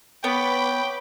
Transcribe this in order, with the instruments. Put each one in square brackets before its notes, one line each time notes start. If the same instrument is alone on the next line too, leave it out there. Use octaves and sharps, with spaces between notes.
[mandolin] B3 [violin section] B4 B5 D6 [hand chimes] C#5 C#6 [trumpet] G5